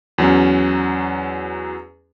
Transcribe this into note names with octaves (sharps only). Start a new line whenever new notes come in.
E2 F#3 C#4